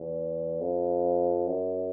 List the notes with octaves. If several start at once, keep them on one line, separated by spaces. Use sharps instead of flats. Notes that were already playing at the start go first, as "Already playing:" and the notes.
Already playing: E2
F2
F#2